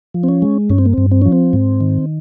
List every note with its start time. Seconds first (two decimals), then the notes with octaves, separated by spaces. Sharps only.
0.14 F3
0.24 C4
0.29 C#4
0.42 G#3
0.70 G2 C#4
0.78 C4
0.86 A#3
0.93 G2 C4
1.11 C4
1.22 F3 C#4
1.32 C4
1.53 G#2
1.81 D#3